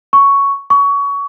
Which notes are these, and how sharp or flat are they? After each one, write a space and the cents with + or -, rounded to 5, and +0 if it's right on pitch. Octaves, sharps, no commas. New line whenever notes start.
C#6 +5
C#6 +25